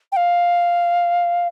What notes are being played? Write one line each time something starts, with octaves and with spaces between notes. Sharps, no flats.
G5
F5